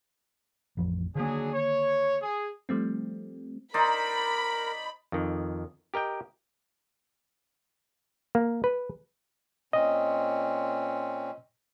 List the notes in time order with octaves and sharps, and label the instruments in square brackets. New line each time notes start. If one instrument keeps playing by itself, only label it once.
[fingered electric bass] A1 F2 F3
[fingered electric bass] D3 D#3 A#3 [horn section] F#3 D4 G#4
[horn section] C#5
G#4
[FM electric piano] F3 G3 A3 C4
[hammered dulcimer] D#4 C5 D5 [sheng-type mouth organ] A#4 [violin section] B5
[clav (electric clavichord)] F2 D#3
G4 A#4 D#5 G5
A#3
B4
[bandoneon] A#2 C4 C#4 [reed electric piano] D#5